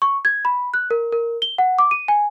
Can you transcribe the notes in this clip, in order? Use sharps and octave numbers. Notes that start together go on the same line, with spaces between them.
C#6
G#6
B5
F#6
A#4
A#4
G7
F#5
D6
D#7
G#5